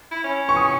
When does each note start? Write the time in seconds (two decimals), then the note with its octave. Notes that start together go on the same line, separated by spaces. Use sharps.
0.11 E4
0.24 C#4
0.49 C#6
0.56 D#6